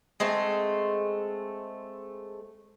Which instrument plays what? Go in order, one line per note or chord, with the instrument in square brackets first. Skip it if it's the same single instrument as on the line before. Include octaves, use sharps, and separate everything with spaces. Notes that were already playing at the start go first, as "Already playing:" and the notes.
[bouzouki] G#3 A3 C4